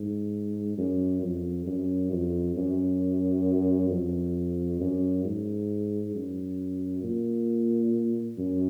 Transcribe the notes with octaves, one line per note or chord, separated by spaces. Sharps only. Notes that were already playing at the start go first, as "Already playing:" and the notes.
Already playing: G#2
F#2
F2
F#2
F2
F#2
F2
F#2
G#2
F#2
A#2
F#2